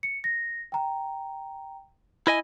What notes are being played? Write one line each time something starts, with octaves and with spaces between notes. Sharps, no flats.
C#7
A#6
G5 A#5
E4 D#5 G#5